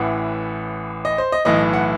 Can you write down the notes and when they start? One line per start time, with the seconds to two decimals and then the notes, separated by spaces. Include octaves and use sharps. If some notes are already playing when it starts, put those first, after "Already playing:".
Already playing: A1 A2 E3 F#5
1.05 D#5
1.18 C5
1.32 D#5
1.45 B1 A2 E3 D#5
1.73 F#5